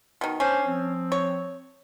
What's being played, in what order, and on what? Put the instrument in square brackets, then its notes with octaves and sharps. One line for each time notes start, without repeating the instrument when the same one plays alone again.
[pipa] B2 D#3
[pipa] C#4 [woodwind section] D4 C5
[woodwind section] F3 C4
[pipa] C#5